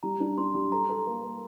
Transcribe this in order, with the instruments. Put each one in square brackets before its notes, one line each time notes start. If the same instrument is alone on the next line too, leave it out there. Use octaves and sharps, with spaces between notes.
[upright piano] G3 [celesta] A#5
[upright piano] D4
[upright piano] D4 [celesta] C6
[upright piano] G3
[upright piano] A4 [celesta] A#5
[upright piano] A4
A#3
A#3